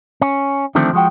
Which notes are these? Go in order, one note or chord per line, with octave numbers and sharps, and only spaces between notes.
C#4
D3 D#3 F3 A3 C4 D4
F3 G#3 F#4 G5